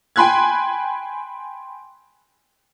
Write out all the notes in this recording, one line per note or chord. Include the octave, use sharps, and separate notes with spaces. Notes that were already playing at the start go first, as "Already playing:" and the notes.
G5 G#5 B5 C6 F#6 G#6